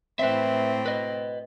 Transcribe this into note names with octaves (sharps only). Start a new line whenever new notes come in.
A2 C4 B4 E5
B4 D#5